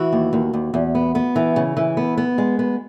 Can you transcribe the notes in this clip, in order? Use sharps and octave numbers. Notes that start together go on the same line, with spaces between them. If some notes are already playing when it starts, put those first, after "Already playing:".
Already playing: E3 F#4
D#2
D#2
D#2
E2
B3
B3
E3
C#3
E3
B3
B3
G#3
B3